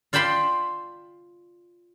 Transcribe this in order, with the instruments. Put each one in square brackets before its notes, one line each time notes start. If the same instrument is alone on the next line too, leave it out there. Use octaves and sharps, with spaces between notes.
[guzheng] F4 D5 G5 A5 B5 C6